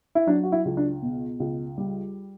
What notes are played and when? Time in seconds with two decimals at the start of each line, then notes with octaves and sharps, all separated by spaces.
0.15 E4
0.27 F#3 D4
0.43 F#4
0.52 E4
0.65 C#2
0.77 D4
1.02 B2
1.40 C#2
1.78 G3